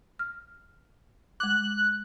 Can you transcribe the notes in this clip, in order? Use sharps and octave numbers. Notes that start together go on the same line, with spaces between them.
F6
G#3 D6 F#6